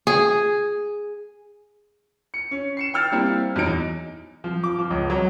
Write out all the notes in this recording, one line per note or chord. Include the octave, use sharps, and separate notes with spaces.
G#4
C#7
C#4
C7 C#7 E7
G5 E6 F6 A6
G3 A#3 C4 E4
E2 F#3 D#4 D7
F3
D6
F3
C#2
F#3